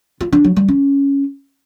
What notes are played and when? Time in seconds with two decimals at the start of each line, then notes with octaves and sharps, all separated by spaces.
0.21 F4
0.33 D4
0.45 F#3
0.56 G3
0.68 C#4